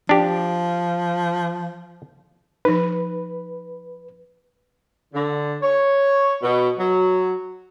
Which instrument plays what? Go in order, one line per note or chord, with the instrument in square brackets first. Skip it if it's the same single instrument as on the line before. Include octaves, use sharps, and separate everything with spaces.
[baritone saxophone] F3 [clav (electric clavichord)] D4 G4
[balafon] F3 D#4 [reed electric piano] B4
[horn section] D3
C#5
B2
F#3